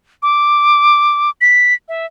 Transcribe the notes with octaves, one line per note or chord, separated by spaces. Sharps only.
D6
B6
E5